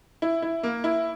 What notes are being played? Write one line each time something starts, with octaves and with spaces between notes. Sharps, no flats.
E4
E4
A#3
E4